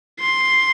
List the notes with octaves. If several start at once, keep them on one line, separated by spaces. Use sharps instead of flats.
C6